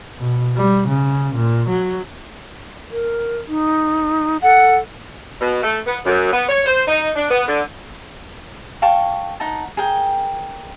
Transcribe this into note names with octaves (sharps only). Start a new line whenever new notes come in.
B2
G3
C#3
A#2
F#3
A#4
D#4
A4 F#5
B2
A3
B3
F#2
B3
C#5
C5
D#4
D4
B3
D3
F5 G5 A5 C#6
D#4 F#5 A5
G#4 A#4 G5